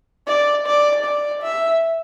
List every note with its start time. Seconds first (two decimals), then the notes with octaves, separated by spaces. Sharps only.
0.28 D5
0.66 D5
1.05 D5
1.42 E5